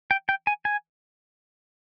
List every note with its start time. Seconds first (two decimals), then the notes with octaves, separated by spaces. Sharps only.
0.11 G5
0.29 G5
0.47 G#5
0.65 G#5